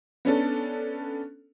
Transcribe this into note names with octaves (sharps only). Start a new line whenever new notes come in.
B3 C#4 D4 A4